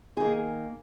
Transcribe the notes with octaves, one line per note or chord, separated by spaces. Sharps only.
D#3 A#3 G#4